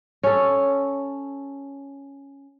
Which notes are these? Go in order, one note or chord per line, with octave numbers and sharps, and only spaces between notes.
C#4 A4